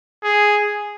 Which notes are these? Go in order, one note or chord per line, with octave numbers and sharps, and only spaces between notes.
G#4